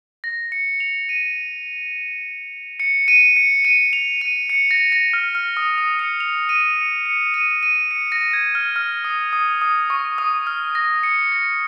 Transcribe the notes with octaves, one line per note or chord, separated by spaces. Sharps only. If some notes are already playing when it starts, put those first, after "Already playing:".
A#6
C#7
F7
D#7
C#7
D#7
C#7
D#7
F7
D#7
C#7
A#6
A#6
F6
F6
D#6
D#6
C#7
F7
D#7
C#7
C#7
D#7
D#7
C#7
A#6
G#6
F6
F6
D#6
D#6
D#6
C#6
D#6
F6
A#6
C#7
A#6